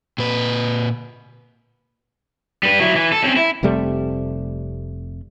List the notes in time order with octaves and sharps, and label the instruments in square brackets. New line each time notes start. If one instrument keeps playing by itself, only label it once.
[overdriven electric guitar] A#2 B4
G3 B4
F#3 E4
E3
A4
C4 C#4
E4
[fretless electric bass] F1 C3 G3 A3